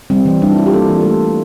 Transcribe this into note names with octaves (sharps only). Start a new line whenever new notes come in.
G3 C4
E3
G3 D4
E4
G3 F4
G4
A#3 A4
E4
E3 F4
A4
A3 G4
A3